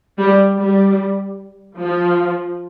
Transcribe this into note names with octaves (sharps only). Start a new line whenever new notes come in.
G3
G3
F3